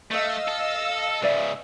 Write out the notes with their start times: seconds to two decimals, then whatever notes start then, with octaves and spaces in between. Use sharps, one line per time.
0.11 A3 D#5 F5 E6
0.48 A4
1.22 G#2 C#3 B4 D5 E5